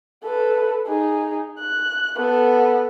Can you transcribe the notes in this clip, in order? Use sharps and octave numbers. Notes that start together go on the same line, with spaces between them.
A4 B4
D#4 G#4
F#6
B3 A4